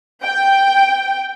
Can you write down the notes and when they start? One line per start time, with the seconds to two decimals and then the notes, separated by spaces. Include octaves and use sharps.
0.24 G5